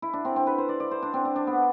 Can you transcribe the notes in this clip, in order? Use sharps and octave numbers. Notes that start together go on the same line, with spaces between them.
E4
D4
C4
C4
B4
C5
D5
D5
C5
D4
C4
D4
D4
B3